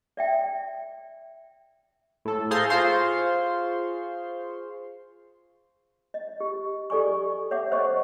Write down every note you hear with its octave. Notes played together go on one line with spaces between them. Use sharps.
D5 E5 G5
A2 A4
G#4 A4 C5 F5 A#5 C6
F4 G#4 C5 F5 C6 C#6
D#5
G4
G4 A4 D5 G#5 C#6
C#5 E5 F#5 D6
C5 D#5 F#5 C#6